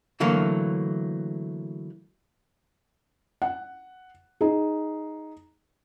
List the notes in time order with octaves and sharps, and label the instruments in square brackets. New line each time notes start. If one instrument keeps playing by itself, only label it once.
[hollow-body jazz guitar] D3 E3 F#3 A3 A#3
[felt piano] F#5
D#4 G#4